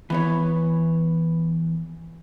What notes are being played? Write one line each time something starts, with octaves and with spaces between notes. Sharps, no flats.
E3 B3 C#5